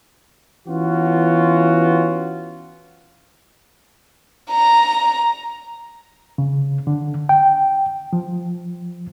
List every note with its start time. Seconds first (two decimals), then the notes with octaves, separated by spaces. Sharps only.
0.68 E3 B3 C#4 F4 F#4
4.51 A#5
6.38 C#3
6.87 D3
7.29 G5
8.13 F3